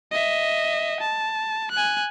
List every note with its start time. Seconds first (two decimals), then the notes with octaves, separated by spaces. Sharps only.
0.11 D#5 E5
1.00 A5
1.72 G#5 F#6